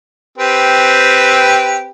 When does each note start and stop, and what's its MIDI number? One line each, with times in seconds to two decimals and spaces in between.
0.38 1.90 60
0.38 1.90 67
0.38 1.90 71